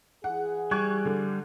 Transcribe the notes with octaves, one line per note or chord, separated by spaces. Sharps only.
E3 E4 G#4 F#5
G3 C#6 F#6 G#6
D3